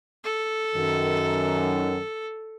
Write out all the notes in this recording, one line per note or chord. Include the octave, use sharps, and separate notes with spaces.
A4
F#2 D#3